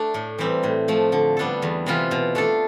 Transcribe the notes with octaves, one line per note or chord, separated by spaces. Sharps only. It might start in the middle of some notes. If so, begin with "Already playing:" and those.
Already playing: A3 D4
A2
E3 G3 C4
A2
F3 A3
D3
G3 B3 D4 A4
E2
C3 E3 B3 F4
B2
A3 D4 A4